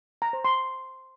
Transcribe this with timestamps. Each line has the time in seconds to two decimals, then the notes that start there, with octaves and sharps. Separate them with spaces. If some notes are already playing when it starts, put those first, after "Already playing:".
0.22 A#5
0.33 C5
0.45 C6